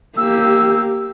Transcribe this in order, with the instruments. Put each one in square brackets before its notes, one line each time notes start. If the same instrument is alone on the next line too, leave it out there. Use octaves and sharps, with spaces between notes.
[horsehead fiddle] A#3 G4 [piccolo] E6